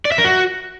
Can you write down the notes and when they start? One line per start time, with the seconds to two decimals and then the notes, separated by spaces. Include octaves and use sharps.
0.05 D5
0.12 E5
0.18 A#4
0.25 F#4